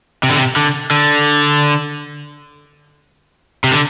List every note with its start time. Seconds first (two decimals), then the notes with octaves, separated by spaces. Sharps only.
0.23 C3
0.30 D3
0.36 C3
0.56 D3
0.91 D3
3.64 C3
3.72 D3